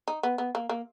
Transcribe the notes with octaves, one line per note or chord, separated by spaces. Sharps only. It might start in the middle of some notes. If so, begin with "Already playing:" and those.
D#4
B3
B3
A#3
A#3